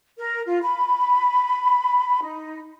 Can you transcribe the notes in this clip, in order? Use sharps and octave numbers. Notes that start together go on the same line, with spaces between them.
A#4
F4
B5
D#4